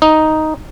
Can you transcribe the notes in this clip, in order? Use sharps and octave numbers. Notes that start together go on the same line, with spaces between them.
D#4